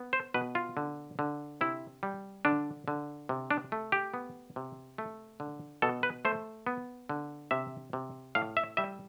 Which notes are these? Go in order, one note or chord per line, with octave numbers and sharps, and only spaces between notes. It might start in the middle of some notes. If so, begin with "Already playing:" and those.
Already playing: B3
C5
B2 B4
F4
D3
D3
C3 E4
G3
D3 D4
D3
C3
D4
A3
G4
B3
C3
A3
D3
B2 A4
B4
A3 C5
B3
D3
C3 E5
C3
A2 F5
E5
G3 E5